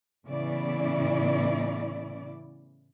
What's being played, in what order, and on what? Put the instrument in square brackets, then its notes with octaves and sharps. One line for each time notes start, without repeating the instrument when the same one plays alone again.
[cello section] A2 C#3 E3 B3 E4 D5